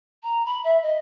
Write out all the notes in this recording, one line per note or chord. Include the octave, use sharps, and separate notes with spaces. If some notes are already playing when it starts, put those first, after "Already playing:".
A#5
B5
E5
D#5